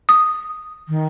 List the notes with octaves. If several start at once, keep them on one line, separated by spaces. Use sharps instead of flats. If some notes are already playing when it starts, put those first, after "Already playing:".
D#6
D#3